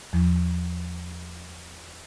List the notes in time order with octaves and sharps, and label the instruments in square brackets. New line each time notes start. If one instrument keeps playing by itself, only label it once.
[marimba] E2 F3